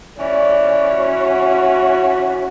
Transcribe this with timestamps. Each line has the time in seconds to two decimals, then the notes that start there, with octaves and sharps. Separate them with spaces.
0.20 E3 C#4 D5
0.93 F#4